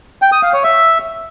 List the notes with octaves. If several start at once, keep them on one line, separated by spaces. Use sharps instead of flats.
G5
D#6
F5
C#5
E5